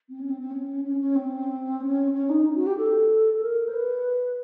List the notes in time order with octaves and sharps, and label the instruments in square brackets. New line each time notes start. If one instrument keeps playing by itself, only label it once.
[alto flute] C4
C#4
C4
C4
C#4
C#4
C#4
C4
C#4
C#4
D#4
F#4
G4
A4
A4
A#4
C5
B4